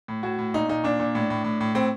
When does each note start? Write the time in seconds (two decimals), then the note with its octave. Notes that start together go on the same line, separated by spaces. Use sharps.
0.08 A2
0.23 A2 F#4
0.39 A2
0.54 A#2 D#4
0.69 A#2 D#4
0.84 A#2 D4
1.00 A#2
1.15 A2
1.30 A2
1.44 A2
1.61 A2
1.75 A2 C4